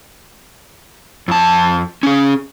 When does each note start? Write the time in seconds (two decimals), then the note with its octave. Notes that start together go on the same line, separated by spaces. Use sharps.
1.28 F2 A5
2.03 C#4 G#4